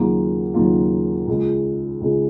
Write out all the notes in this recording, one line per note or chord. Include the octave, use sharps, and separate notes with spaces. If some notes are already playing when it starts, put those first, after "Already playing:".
Already playing: D#2 C#3 F#3 A#3 F4
D#2 C#3 F#3 A#3 F4
C#2 C#3 G#3
C#2 C#3 G#3